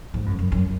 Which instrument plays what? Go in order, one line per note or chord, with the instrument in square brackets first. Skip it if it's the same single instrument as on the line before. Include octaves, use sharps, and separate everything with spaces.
[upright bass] G#2
F#2
F#2
F#2